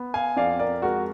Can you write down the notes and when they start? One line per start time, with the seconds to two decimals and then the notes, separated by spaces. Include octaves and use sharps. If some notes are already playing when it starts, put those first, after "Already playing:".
Already playing: B3
0.14 F5 G#5
0.36 F2 D5 F5
0.59 A#4 D5
0.82 G#3 F#4 A#4